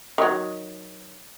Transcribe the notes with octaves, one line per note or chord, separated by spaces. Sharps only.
D#3 F#3